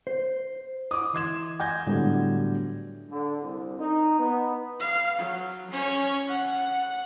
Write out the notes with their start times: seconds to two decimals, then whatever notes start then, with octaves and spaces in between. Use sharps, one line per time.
0.07 C5
0.91 D6 D#6
1.13 E3 C6 G#6 E7
1.60 G#5 G6 G#6 A#6
1.86 A2 D3 F#3 G3 B3
3.10 D3
3.41 C2
3.79 D#4
4.19 B3
4.80 F5
5.18 F#3
5.71 C#4 C#5
6.29 F#5